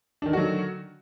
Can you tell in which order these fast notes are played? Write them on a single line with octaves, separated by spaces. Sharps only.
D4 D#3 D3 F#4 F#3